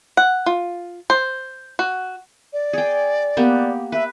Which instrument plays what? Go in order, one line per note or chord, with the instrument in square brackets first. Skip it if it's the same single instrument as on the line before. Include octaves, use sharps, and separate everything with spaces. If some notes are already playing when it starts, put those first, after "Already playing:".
[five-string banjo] F#5
F4
C5
F#4
[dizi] D5
[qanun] G#4 G5
A#3 B3 G4
[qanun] B4 [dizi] E5